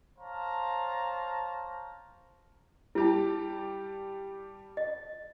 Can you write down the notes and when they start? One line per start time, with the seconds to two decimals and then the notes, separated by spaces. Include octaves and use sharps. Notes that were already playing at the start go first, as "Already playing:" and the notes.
0.19 C5 C#5 F5 A5 A#5
2.95 G3 E4 G4 A5
4.77 D#5